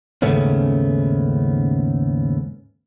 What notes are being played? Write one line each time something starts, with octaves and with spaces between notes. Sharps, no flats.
D#2 G#2 C#3 A3 B3 C#4